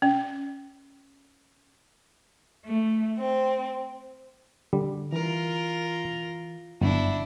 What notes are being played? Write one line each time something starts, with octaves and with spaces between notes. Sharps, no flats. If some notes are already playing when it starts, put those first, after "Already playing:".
C#4
A3
C4
D3 G3
E3 F4 A#4
G1 F#2 D4 E4